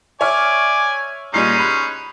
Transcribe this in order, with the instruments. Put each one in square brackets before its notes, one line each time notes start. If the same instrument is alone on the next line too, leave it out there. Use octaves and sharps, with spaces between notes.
[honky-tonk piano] C#5 E5 F6 [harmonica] D5 G#5
[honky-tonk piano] A#2 G3 C7 [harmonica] G#3 C#4 D#4
[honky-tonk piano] B5 F#6